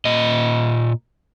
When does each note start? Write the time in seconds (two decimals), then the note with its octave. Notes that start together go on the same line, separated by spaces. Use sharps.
0.05 A#2 D#5